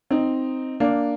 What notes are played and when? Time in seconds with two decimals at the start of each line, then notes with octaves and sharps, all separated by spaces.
0.11 C4 D#4
0.80 A#3 D4